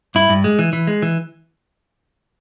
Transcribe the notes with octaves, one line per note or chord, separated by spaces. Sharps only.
G2 E4
G2
G#3
E3
E3
G#3
E3